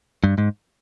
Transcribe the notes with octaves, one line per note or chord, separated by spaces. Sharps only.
G2
G#2